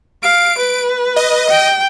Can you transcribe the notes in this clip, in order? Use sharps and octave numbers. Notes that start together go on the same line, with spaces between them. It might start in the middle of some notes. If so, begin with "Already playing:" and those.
F5 D7
B4
D#5
G5